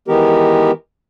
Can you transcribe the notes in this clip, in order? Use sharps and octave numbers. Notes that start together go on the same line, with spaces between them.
D#3 E3 G#3 B3 G4 A#4